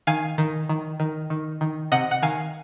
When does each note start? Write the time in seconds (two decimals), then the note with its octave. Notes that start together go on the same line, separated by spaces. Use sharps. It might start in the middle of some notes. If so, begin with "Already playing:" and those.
0.07 D#3 F5 G#5
0.38 D#3
0.69 D#3
1.00 D#3
1.30 D#3
1.61 D#3
1.92 C3 D#5 F#5
2.11 F#5
2.22 D#3 F5 G#5